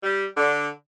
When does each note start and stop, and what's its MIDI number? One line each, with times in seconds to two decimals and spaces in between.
0.03 0.25 55
0.36 0.68 50